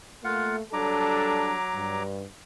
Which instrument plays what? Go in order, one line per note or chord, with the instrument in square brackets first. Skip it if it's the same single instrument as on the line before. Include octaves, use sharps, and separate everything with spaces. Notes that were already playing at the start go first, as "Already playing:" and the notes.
[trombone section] A3 A#3 [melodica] F4 F5 F#5
[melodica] F#3 A#5 D6 [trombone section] G3 D4 A4
[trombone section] G2